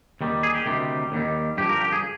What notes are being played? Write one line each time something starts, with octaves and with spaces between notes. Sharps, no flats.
D#2 D#3 G3
G#4
G4
D2 C3 D#3 G3
D#2 D#3 G3
G2 D3 F3 G4
A#4
G4
G#4